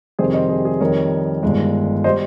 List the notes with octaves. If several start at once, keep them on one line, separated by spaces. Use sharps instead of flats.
F2 C3 D#3 G3 G#4 C5
C5 D#5
G#4
G#4
F2 D#3 G3 A#4 C#5
G1 G2 D#3 G#3
C5 D#5
G3